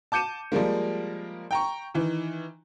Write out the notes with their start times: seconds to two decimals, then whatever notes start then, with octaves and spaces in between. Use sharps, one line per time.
0.12 A5 D6 G6 C#7 D#7 E7
0.52 F3 G3 G#3 A#3
1.51 G5 A#5 C#6
1.94 D#3 E3